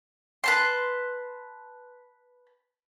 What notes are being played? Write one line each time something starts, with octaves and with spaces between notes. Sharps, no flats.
B4 A5 C6